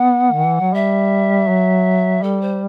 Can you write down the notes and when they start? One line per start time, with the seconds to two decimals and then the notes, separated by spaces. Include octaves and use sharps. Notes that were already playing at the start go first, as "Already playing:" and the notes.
Already playing: B3 F#5
0.33 D#3
0.47 E3
0.61 F#3
0.74 G3 E5
1.48 F#3
2.22 G3 A4
2.41 C5